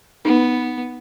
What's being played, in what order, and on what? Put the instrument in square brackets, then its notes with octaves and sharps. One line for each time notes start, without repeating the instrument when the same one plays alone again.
[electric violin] B3 [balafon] D#4